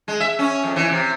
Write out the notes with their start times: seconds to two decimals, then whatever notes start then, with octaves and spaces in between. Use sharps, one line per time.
0.08 G#3
0.20 E5
0.39 C#4
0.64 F2
0.76 E3
0.90 C3